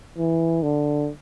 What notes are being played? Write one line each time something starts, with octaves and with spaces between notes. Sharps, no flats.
E3
D3